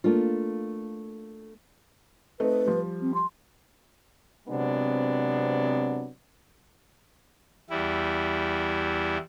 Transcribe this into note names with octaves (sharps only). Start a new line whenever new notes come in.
A3 A#3 D4 F4
A3 C4 D#4 B4
F3 G3
C4
C6
C3 F#3 G#3 B3 C4 D4
E2 G3 E4